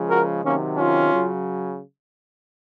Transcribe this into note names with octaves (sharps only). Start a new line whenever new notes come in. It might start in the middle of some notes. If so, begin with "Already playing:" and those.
Already playing: C#3 F3 G#3
F#4 A#4
C3 D#3 F#3 A#3 C#4
C#4 F4
C#3 F#3